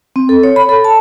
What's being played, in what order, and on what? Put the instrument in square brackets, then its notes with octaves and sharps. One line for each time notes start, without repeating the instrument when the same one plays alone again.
[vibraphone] C4
A4
C#5
B5
A4
A5